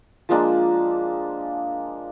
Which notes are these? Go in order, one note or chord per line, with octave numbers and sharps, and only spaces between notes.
F3 G#3 A#3 D4